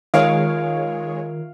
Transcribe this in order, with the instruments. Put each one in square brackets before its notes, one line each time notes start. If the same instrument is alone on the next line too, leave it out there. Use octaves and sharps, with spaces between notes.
[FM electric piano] D#3 [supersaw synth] G#3 G#4 C#5 [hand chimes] F4 A#4 D7 [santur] F5